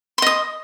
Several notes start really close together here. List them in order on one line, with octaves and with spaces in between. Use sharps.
C6 D#5 D#6